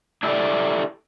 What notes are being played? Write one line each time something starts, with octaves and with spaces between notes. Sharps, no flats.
D4 E4 G4 A4 D5